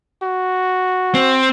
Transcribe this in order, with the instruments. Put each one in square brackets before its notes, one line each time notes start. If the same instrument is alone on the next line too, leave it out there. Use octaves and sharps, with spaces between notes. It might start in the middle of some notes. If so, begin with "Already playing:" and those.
[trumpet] F#4
[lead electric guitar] C4